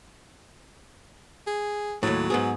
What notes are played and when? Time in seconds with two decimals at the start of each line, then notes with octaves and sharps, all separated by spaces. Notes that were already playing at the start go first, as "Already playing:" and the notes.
1.47 G#4
2.03 D#2 A2 F#3
2.30 G#2 B3 G#4